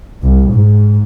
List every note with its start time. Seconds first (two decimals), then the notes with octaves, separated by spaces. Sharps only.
0.22 C2
0.51 G#2